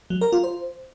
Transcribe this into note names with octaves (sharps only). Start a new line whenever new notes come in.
F#3
A#4
F4
C5